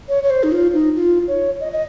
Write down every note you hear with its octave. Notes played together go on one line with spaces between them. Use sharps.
C#5
C#5
C5
D#4
F4
D#4
F4
C#5
D#5
D#5